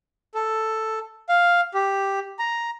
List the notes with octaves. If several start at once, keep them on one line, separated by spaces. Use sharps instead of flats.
A4
F5
G4
A#5